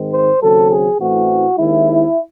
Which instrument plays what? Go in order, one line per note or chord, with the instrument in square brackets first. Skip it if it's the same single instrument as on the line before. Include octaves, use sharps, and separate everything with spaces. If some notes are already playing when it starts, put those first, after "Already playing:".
Already playing: [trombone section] G#2 D#3 G#3 C4
C5
D#2 C#3 F#3 C4 A4
G#4
A1 A2 E3 A3 C4 F#4
D#2 D#3 G#3 C4 E4